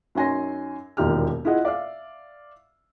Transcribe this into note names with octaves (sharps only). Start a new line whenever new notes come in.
F#2 D#4 C#5 G#5 C6 A#6
E1 D#2 A#2 D#4 G4 F6
E4 F4 G#4 D#5 F#5
D5 E5 F5